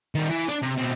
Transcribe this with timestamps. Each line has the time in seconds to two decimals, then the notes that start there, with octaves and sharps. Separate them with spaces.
0.15 D#3 G3
0.29 E3
0.48 D4 D5
0.62 C3
0.78 B2 C4